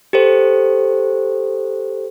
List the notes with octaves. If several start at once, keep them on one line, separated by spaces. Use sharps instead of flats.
G4 A4 C5